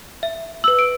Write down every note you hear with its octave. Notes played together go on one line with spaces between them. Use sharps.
E5
B4 E6 F#7
D7